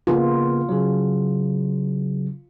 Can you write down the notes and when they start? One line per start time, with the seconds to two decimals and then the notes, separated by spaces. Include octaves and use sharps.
0.07 C#3 A#3 B3 F4
0.69 C#3 F#3